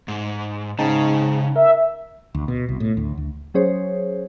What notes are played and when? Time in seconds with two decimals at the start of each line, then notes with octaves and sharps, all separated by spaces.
0.08 G#2
0.79 G#2 C#3 D#4 G5 A5
1.56 A#4 E5
2.35 D2
2.48 B2
2.69 C2
2.80 A2
2.97 D2
3.18 D2
3.54 F#3 C#4 G#4 C5 C#5